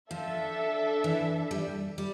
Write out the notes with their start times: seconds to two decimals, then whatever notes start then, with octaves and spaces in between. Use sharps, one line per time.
0.11 F3 D4 A4 E5
1.04 E3
1.51 G3
1.98 G3